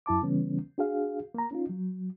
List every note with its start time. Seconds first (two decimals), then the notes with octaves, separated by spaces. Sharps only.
0.06 F#2 E4 A5 D6
0.22 C#3 E3 G3 B3 C#4
0.78 D4 F#4 G#4 F5
1.34 A#3 A#5
1.51 C#4 D#4 F4
1.69 F#3